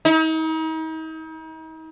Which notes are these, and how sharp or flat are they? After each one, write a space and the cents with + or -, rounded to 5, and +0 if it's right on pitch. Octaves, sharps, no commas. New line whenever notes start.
D#4 +40